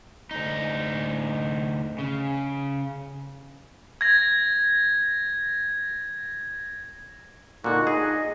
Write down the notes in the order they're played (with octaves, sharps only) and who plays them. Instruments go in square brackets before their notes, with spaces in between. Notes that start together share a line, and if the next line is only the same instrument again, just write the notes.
[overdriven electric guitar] D2 D#4
C#3
[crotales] G#6 A#6
[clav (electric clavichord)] A#2 D3 [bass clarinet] D#4 [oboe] F#4
[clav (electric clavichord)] G#4 [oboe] D#5